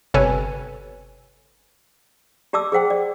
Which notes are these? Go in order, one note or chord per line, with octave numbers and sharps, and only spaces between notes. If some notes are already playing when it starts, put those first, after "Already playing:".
G1 C3 A4 B4 C#5 G#5
G4 D5 A5 D6 E6
G#4 C5 F#5 G5
D5